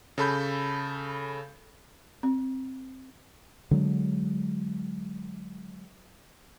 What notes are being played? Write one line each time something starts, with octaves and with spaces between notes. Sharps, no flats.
C#3 A4 B5 G6
C4
D3 F#3 G#3